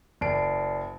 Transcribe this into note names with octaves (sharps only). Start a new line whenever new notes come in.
F#1 D5 A5 C7 D7